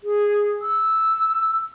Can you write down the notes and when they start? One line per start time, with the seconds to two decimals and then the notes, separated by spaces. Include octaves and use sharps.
0.04 G#4
0.62 E6